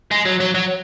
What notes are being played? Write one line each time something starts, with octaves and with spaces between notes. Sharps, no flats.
G#3
F#3
F#3
F#3